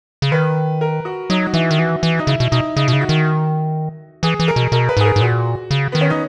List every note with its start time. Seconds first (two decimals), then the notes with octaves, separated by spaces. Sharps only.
0.22 C#3
0.32 D#3 B4
0.81 A#4
1.05 F#4
1.30 F#3 D#4
1.46 F#4
1.54 E3 E4
1.71 D#3
1.78 E3 F#4
2.03 E3
2.19 D#4
2.27 C#3 E4
2.40 B2
2.52 B2 D#4
2.76 C#3 D#4
2.88 B2
2.93 C#3
3.01 F#4
3.09 D#3
4.23 E3 G#4
4.40 E3
4.48 A#4
4.56 B2
4.72 B2 A#4
4.89 B4
4.97 G#2 G#4
5.05 A#4
5.16 G#2
5.21 A#2 F#4
5.71 C#3
5.92 D#3 B3
6.01 C#4
6.10 D#4